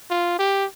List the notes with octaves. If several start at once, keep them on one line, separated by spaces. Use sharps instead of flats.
F4
G4